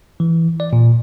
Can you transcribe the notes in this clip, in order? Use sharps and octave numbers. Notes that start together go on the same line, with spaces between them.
E3
D5
A#2